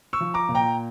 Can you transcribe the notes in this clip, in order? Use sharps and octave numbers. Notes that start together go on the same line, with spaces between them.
C#6 E6
F3
A#5 D6
A#2
G5 A#5